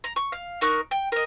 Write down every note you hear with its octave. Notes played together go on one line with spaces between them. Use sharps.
A#5
C#6
F5
D#4 A#4 C#6 F#6
G5
A#4 D#5